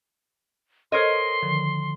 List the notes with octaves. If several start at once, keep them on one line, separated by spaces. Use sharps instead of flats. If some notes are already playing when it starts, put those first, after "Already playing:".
A4 A#4 C5 C#5 D#5 C6 G#6
D3 D#3 F3